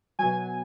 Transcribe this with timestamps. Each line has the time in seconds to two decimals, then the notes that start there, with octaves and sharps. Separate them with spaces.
0.19 B2 F#3 G#5